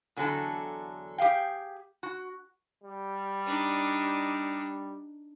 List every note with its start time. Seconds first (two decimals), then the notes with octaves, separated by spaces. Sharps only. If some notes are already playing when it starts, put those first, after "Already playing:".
0.16 E2 D3 F#3 D4 A4 A5
1.18 G4 G#4 F5 G5
2.03 F#4
2.83 G3
3.46 D4 D#4